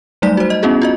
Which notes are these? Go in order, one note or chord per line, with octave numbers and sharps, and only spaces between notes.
F#3 G3 A3 D#4 D5 B6
F#4 C5
D#5
B3 C#4 E4 F#4 G#4
F4 F#4 D#5